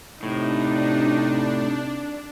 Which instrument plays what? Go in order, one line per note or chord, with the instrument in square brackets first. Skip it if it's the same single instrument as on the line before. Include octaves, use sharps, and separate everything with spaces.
[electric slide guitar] A2 [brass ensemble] C3 [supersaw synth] D4 [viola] D#4